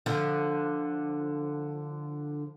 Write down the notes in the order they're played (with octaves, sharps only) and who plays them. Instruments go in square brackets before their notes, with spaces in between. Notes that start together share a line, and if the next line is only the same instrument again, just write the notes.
[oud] D3 F3